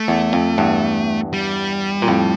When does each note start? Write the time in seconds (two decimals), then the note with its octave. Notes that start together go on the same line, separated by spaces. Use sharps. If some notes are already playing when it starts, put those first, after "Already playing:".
Already playing: A3
0.08 E2
0.33 F2
0.58 E2 G2
1.33 G3
2.02 A#2
2.08 F2 A2